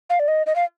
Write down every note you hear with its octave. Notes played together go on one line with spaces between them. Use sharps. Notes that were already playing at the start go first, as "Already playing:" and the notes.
F5
D5
D#5
D#5
F5